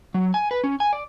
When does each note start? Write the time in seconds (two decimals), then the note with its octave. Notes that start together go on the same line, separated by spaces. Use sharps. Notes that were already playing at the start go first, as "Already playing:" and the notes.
0.14 F#3
0.34 G#5
0.51 B4
0.64 C#4
0.80 G#5
0.93 D5